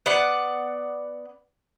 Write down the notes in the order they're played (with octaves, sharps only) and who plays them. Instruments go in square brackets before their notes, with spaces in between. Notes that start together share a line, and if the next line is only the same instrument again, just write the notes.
[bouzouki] B3 D5 F#5